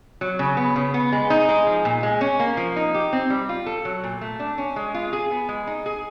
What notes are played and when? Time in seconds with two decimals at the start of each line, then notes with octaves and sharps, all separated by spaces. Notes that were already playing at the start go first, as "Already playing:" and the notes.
0.21 F#3
0.39 C#3
0.57 B3
0.76 C#3
0.94 B3
1.12 G#3
1.30 D#4
1.49 G#3
1.67 F3
1.85 A#2
2.03 G#3
2.21 C#4
2.40 A#3
2.57 F3
2.76 D#4
2.94 G4
3.13 C4
3.30 G3
3.49 F4
3.66 A4
3.85 F#3
4.04 A#2
4.21 A3
4.40 D4
4.58 C#4
4.76 G#3
4.94 F4
5.13 G#4
5.31 B3
5.49 G#3
5.67 D#4
5.86 G#4